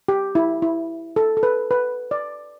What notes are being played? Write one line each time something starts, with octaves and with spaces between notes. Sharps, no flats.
G4
E4
E4
A4
A4
B4
B4
D5